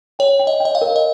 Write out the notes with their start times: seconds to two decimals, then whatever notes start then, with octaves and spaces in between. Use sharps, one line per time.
0.19 C#5 G5
0.40 G5
0.47 D#5
0.60 D#5 G5
0.75 F5
0.81 A#4
0.96 D#5